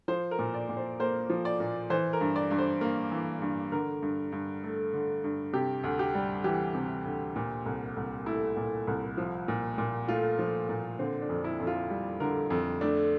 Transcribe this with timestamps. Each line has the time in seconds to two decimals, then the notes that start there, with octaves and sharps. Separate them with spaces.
0.08 F3 C5
0.31 A#4
0.39 A#2
0.54 D5
0.69 A#2
0.77 C5
1.00 A#3 C5
1.30 F3
1.45 D5
1.60 A#2
1.90 E3 C5
2.13 A#4
2.21 G2
2.36 D5
2.51 G2
2.59 C5
2.81 A#3
3.12 E3
3.42 G2
3.72 D3 A#4
4.02 G2
4.32 G2
4.64 A3
4.94 D3
5.24 G2
5.53 C3 G4
5.84 D2
5.99 G4
6.15 G3
6.44 E3 G4
6.75 C3
7.05 D2
7.36 A#2
7.66 C2
7.96 C2
8.26 A3 E4
8.57 A#2
8.87 C2
9.18 F3
9.48 A#2
9.78 A#2
10.08 A3 F4
10.39 F3
10.69 A#2
10.99 D3 C4
11.22 D4
11.29 F2
11.44 E4
11.60 F2
11.67 F4
11.90 G3
12.20 D3 A#4
12.50 F2 A4
12.81 A3 D4